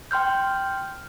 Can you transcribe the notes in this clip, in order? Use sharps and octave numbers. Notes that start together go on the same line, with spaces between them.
G5 C6 F6 G6